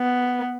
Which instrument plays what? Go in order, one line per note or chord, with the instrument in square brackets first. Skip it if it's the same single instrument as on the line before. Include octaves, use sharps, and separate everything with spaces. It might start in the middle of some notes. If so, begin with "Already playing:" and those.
Already playing: [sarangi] B3